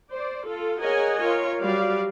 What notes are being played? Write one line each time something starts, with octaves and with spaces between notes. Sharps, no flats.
C5 D5
F4 A4
G#4 A#4 C#5 D#5 F#5 G#5
F4 A#4 C#5
F#3 G3 F#4 D5 F5